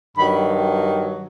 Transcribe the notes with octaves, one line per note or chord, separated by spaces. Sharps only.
G2 D#3 F#3 B5